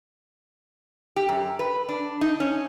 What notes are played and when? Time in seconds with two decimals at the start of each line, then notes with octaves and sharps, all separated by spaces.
1.16 G4
1.29 F#2
1.59 B4
1.89 D4
2.21 D#4
2.40 C#4